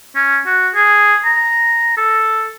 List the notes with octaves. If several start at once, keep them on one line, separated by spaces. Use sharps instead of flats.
C#4
F#4
G#4
A#5
A4